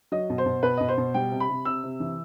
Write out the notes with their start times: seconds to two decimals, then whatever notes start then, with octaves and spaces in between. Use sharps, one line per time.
0.12 F#3 D#5
0.30 B2
0.38 C5
0.46 B2
0.63 B2 B4
0.77 B2 D#5
0.89 C5
0.98 B2
1.14 G3 G5
1.32 C3
1.40 B5
1.49 C3
1.65 C3 E6
1.84 C3
2.00 E3